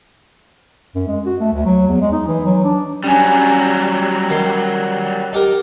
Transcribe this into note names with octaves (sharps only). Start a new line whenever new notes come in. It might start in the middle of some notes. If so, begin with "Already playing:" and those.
F#2
G#3
F#4
A3
D2
F#3
E2
G#3
D#4
E3
F#3
D4
F#3 G3 C#4 G#5
D#3 C6
D#4 G4 A#4